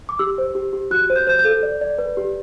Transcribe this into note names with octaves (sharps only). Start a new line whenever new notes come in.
D6
G4 E6
C5
G4
G4
F#4 F#6
C5
G6
C5 G6
G6
A4
D5
D5
B4
G4